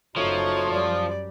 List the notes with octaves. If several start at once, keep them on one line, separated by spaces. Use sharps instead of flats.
F#1 F3 A3 D#4 F#4 C#5
F#2 G3 D5